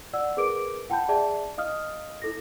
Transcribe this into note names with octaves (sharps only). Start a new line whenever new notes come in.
D5 F#5 E6
G#4 A#4 B4 D6 D7
F#5 G5 A5 B5 G6
G#4 D5 E5 A5
D#5 F5 D#6 F6
E4 A4 A#6